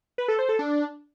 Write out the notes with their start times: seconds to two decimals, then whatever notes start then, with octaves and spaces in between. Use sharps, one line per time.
0.18 B4
0.28 A4
0.39 C5
0.49 A4
0.59 D4